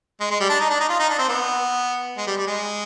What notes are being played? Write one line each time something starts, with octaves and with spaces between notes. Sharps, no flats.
G#3
G#3
G3
D4
D#4
D4
D#4
F4
D#4
D4
C4
B3
G#3
G3
G3
G#3